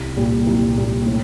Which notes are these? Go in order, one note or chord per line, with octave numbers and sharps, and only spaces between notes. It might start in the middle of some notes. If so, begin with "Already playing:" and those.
Already playing: C2
A#2 G3
C2
A#2 G3
A2